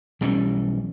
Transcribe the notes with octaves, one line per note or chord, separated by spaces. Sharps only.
B1 E3 G3 C#4